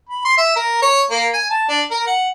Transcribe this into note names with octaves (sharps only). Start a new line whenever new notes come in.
B5
C6
E5
A#4
C#5
A#3
G#5
A5
D4
A#4
F#5